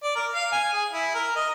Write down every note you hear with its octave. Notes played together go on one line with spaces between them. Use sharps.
D5
A#4
F5
G#5
G#4
E4
A#4
D#5